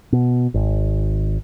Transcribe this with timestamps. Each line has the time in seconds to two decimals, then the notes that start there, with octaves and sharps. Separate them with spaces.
0.12 B2
0.54 G#1